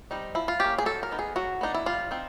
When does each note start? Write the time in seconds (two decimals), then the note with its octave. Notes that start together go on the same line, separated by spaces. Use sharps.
0.11 G3 C4 D#4
0.35 F3 E4
0.48 F4
0.60 A#3 C#4 G4
0.78 G#4
0.85 F#3 A4
1.03 A#4
1.11 B3 D#4
1.19 G#4
1.36 F#3 F#4
1.61 B3 D4 D#4
1.74 E4
1.86 G3 F4
2.11 C4 D#4